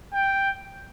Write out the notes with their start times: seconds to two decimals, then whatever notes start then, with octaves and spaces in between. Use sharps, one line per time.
0.13 G5